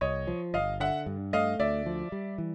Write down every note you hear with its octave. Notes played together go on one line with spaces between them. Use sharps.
C2 C#5 D#5
F3
G1 D#5 F5
D3 E5 F#5
G2
A3 D#5 F5
D2 D5 E5
F3
G3
E3